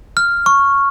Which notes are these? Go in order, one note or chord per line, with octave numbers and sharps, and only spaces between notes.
F6
C#6